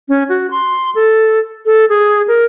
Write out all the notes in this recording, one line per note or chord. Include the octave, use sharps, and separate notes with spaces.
C#4
F#4
C6
A4
A4
G#4
A#4